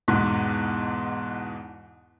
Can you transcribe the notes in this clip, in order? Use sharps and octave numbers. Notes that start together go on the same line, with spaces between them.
E2 G#2 B2